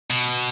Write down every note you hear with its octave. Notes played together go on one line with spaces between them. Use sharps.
B2